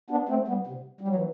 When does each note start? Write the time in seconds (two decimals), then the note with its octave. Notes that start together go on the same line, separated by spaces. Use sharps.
0.10 B3 D4
0.29 A3 C4
0.47 G3 B3
0.67 C3
1.01 G3
1.08 F#3
1.15 E3